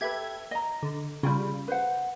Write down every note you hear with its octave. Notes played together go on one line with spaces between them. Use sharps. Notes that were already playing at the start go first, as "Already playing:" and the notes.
G4 A4 B4 E5 G#6
D#5 A#5
D3
C#3 G3 F4 G5 B5
B4 C5 F#5